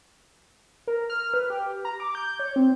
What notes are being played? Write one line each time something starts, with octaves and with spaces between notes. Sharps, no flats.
A#4
F6
B4
G4
A#5
D6
G6
C#5
C4